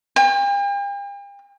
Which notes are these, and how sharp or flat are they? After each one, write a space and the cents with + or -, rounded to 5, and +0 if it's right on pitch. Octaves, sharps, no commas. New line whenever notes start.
G5 +45